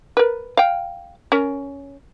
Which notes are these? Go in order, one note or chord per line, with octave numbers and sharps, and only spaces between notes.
A#4 B4
F5 G5
C#4 A#4